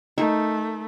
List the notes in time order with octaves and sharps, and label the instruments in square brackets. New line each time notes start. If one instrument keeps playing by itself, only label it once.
[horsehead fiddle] A3 [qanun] D#4 A#4 E5